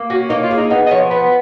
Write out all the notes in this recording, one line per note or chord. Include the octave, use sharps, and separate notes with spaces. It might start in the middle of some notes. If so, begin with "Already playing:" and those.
Already playing: A#3
C#4 F#4
A#3 D#4
F4
G#4
D#4
B3 D#4
D#5
F3 C#5
B3 B4